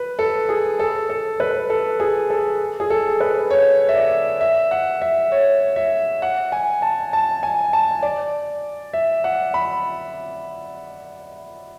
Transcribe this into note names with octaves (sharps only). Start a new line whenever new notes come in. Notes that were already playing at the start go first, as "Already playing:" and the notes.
Already playing: B4
A4
G#4
A4
A4
B4
A4
G#4
A4
G#4
A4
B4
C#5
E5
D5
E5
F#5
E5
C#5
E5
F#5
G#5
A5
A5
G#5
A5
D5
E5
F#5
B5